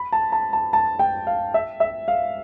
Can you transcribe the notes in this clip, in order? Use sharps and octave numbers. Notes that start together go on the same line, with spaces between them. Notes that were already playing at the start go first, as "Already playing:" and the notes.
Already playing: B5
A5
A5
A5
A5
G5
F5
E5
E5
F5